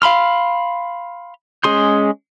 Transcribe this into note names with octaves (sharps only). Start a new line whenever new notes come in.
F5 B5 C6 F6
G#3 C#4 G#4 C6 G6